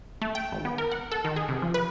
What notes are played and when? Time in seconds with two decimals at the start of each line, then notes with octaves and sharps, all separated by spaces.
0.21 A3
0.35 G5
0.52 G#1
0.65 B3
0.78 A#4
0.91 F#5
1.12 A4
1.25 D#3
1.36 G#4
1.48 C3
1.62 F3
1.74 B4